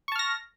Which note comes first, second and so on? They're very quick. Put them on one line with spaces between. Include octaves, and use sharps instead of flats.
C#6 A5 F6 A#6